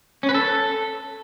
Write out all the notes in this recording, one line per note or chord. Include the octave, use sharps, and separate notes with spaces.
C#4
B4
A4